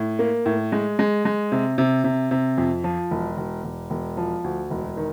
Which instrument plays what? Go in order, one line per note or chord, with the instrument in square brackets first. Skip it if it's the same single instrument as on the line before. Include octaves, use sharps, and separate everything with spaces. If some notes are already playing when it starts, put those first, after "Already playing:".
Already playing: [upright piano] A2
A#3
A2
G#3
G#3
G#3
C3
C3
C3
C3
F2
F3
E1
E1
E1
E1
F3
D2
E1
D#3